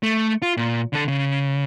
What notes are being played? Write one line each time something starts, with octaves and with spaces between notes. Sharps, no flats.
A3
F4
A#2
D3 A4
C#3